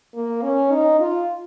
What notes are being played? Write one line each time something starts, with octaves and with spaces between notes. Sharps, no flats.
A#3
C#4
D#4
F4